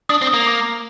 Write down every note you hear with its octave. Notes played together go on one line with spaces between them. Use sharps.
D4 D#6
C4
D#6
A#3
D6